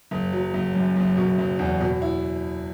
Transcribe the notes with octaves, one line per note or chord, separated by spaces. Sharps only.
F#1
F#3
F#1
F#2
F#1
B2
F#1
E2
B2
E4